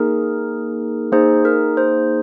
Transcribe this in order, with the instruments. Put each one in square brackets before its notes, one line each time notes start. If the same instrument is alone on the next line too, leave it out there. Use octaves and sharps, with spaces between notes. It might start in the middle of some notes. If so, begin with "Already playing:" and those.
Already playing: [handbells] A#3 D#4 G#4 A#4
A#3 D#4 G#4 C5
A#4
C5